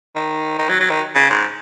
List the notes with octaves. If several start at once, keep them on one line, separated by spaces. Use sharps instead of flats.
D#3
D#3
F#3
F#3
D#3
C#3
G#2